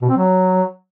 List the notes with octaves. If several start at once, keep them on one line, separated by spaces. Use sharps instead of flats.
B2
C4
F#3